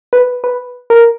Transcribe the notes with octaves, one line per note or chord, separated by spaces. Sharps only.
B4
B4
A#4